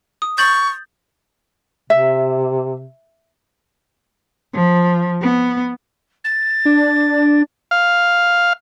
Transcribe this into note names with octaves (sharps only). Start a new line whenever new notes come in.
D#6
C#6 G6 A6 F#7
C3 E5
F3
B3
A6
D4
F5